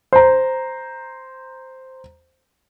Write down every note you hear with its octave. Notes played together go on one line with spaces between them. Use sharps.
C5 A#5